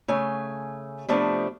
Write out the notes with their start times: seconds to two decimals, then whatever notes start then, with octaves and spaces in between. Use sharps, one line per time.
0.08 C#3 A3 G#5
1.09 C3 F3 A3 B3 D4